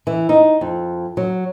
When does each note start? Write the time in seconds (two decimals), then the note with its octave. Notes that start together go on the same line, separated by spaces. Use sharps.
0.07 E3
0.29 D#4
0.61 F2
1.17 F#3